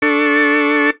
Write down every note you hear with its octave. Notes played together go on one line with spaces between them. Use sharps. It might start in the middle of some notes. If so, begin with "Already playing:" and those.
D4 A4 C#6